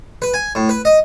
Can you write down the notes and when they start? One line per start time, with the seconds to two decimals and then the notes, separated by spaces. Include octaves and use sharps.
0.22 B4
0.34 G#5
0.55 A2
0.69 B4
0.85 D#5